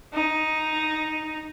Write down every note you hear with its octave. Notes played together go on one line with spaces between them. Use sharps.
D#4